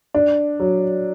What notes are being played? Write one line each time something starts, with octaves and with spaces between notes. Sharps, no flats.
D4
F#3